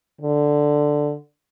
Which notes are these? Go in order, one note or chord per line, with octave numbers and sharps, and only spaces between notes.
D3